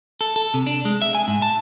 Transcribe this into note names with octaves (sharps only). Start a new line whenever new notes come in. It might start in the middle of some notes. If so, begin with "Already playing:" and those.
A4
A4
C3
D4
G#3
E5
G#5
G#2
A5